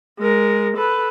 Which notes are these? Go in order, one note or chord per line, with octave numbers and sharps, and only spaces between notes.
G#3 A#4
A4 B4